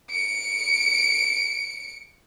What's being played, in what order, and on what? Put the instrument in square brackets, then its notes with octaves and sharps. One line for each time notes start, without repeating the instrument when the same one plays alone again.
[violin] C#7 D7